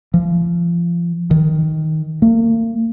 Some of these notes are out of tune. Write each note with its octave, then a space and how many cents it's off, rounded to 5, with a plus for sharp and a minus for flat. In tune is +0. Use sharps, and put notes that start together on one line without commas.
F3 -30
D#3 +10
A#3 -40